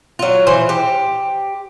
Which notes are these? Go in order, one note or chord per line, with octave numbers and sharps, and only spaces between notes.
F#3 F4
E3 C5
G4